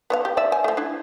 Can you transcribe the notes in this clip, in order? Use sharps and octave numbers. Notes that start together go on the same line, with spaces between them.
B3 C#5 F5
G4
D5 E5
G#5
F3 A3
D4 E4